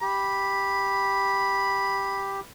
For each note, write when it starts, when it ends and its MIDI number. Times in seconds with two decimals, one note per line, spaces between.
0.02 2.40 67
0.02 2.47 83